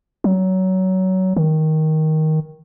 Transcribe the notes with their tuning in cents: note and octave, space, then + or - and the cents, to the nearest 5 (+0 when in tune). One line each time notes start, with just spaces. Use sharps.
F#3 +20
D#3 +10